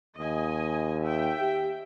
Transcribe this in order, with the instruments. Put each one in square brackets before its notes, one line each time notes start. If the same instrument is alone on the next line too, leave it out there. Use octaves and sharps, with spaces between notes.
[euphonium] D#2 [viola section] D#5 G#5
[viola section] E5 G5
[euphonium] G4